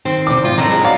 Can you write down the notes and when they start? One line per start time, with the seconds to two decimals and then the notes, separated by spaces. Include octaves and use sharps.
0.05 D#3 C4
0.27 E2 C3 D6
0.45 G#2 F4
0.58 F2 A#2 D#3 F#3 C4 E4 A#5
0.71 G3 G#3
0.85 F#3 D5 F5 F#5